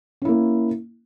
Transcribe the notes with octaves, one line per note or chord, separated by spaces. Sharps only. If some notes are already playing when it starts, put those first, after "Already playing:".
A#3 C#4 E4